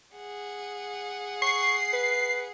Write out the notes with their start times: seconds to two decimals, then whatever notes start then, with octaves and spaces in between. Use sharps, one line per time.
0.17 G#4 F#5
1.42 C#6 C7
1.93 B4